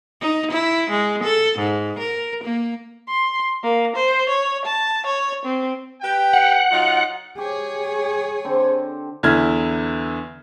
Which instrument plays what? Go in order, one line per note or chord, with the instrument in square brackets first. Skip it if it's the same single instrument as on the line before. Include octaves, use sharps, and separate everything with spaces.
[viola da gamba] D#4
E4
G#3
A4
G#2
A#4
A#3
[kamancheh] C6
A#3
C5
C#5
A5
C#5
C4
[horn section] G4 B4 G5
[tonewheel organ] F#5
[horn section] F#3 D#4 F4
[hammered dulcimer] G4 [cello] G#4 C#5
[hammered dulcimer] D3 C4
[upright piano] E2 D3 E4 F6 G#6